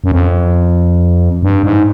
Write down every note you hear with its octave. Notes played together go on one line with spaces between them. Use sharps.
F#2
F2
G2
G#2